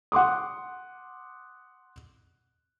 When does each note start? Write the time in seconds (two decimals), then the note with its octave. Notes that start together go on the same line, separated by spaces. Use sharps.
0.12 F#5 C6 D6 D#6